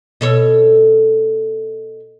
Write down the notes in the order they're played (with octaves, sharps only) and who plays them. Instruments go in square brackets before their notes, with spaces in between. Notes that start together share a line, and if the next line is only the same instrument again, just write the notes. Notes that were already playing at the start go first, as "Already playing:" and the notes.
[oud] B2 A4 C#5